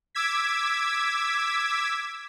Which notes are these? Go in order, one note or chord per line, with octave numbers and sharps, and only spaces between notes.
D6 E6 G#6 B6